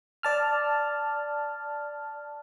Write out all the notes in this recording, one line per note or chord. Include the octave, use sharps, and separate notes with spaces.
D5 A5 F6